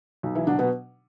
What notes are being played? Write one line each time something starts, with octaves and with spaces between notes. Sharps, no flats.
B1
E3 E4
B2 D3 F#3 D4
B2 B3